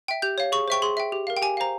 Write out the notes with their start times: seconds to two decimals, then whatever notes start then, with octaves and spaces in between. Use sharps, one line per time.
0.08 E5 G5
0.22 G4 G6
0.38 C#5 F5
0.52 G#4 C#6
0.68 C5 E5 G5 C#6
0.82 G#4 C6
0.97 E5 G5
1.12 G4
1.27 A#4 F5
1.37 G5
1.42 G4 G#5
1.57 C5 F5 A#5